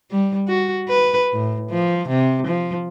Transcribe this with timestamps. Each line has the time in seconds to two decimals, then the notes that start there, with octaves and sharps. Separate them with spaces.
0.11 G3
0.48 F#4
0.89 B4
1.32 A2
1.70 F3
2.09 C3
2.47 F3